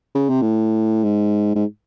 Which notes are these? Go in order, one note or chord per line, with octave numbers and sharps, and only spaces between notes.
C#3
C3
A2
G#2
G#2